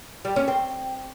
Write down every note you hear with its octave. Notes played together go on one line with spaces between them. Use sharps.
G3
C#4
C4